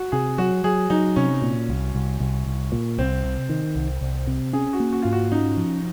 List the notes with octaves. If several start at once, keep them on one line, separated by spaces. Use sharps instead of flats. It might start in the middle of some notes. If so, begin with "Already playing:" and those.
Already playing: F#4
C3 G#4
F#3 F#4
F#3 G#4
F#3 D#4
C3 C#4
A#2
C2
C2
C2
C2
A#2
C2 C4
C3
D#3
C2
C2
C3
C#4 G#4
F#4
A#3
F#4
G#2 F4
F#4
C#4 D#4
F3